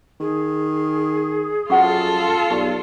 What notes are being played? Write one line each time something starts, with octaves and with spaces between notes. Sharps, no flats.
D#3 G#4
F#2 F4 A4 C5 F#5 C#6
B1 G4 D5